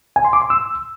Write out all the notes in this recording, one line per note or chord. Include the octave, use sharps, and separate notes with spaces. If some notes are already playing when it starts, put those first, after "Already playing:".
G#5
C6
D6
C6
E6